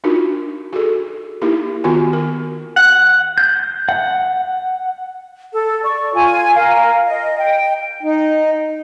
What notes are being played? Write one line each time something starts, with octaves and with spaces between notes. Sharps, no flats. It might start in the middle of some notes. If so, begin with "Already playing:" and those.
D4 D#4 F4 F#4 A#4
F#4 G#4 A4
A#3 D#4 E4 G4 A#4
D#3 B3 F4 F#4 A#4 G#5
A#4
F#5
G6
F#5
A4
D5 C#6
F4 G#5
A#4 F5
D#5
G5
D#4